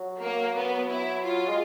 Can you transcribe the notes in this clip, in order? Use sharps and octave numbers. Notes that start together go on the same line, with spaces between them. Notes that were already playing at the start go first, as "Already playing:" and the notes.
Already playing: F#3
A#3
B3
E4
F4
G#3